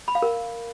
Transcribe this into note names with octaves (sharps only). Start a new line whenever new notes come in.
B5
F5
A#4